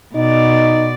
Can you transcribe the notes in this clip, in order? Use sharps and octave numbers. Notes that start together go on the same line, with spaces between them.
B2 D#4 D5